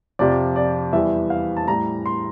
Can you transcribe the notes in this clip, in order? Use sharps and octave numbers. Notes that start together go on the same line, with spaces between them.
F2 C3 F3 D5
D5
E2 E3 G3 E5
F5
A5
A2 G3 A#5
C6